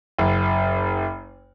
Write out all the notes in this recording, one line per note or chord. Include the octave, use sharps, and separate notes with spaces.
F#1